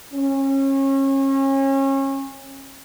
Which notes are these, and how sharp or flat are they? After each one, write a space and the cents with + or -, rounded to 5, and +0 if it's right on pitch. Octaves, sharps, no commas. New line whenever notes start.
C#4 -30